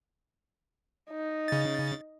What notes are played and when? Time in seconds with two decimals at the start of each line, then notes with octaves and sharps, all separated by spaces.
1.10 D#4
1.48 C#3 A6